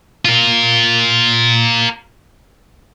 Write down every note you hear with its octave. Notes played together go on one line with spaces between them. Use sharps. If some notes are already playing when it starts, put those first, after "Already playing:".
F4 A#4